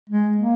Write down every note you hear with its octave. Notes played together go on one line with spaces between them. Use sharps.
G#3
A#3